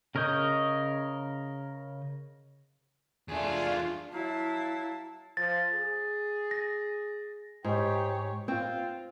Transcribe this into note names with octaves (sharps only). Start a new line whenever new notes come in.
C#3 A#4 C#5 D#5 G6
E2 A3 D4 F4 G#4
F#3 E4 F5 A5
F3 A6
G#4
A#6
G#2 G4 C#5
C4 F4